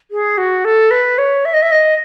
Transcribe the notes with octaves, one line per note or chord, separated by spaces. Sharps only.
G#4
F#4
A4
B4
C#5
E5
D#5
E5
D#5